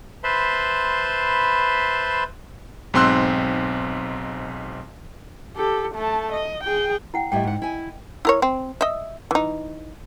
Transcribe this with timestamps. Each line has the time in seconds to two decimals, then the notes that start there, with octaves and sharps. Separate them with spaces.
0.24 B4 C5 E5 A5 B5 C6
2.94 B1 G#2 C4 C6 E6 F#6
5.56 G4 A4
5.95 A3 A5
6.33 D#5
6.64 G#4 G5
7.14 E4 F#5 G5
7.32 A2 G3 E4 D#5 G5
7.44 G#2 F#5
7.62 E4 G#5
8.25 E4 A#4 C#5
8.42 C4
8.81 D#5 E5
9.31 E3 D#4